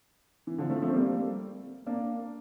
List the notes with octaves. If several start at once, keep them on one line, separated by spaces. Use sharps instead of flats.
E3
D3 F3
F3 A3
F3 A3
C4
G3 A#3
A#3 D4